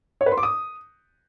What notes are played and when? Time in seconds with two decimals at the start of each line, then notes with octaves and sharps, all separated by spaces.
0.21 C#5
0.26 B4
0.32 C6
0.37 D6
0.43 D#6